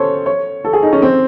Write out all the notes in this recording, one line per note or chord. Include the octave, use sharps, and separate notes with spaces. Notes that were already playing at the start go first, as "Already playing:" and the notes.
Already playing: C#4 A4 C5 C#5
C#5
A4
G#4
D#4
C#4
C4